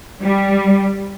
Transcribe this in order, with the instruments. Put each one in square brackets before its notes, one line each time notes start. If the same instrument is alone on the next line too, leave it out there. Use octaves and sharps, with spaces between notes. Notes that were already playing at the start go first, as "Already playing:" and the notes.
[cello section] G3